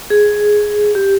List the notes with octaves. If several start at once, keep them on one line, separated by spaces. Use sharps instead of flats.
G#4
G4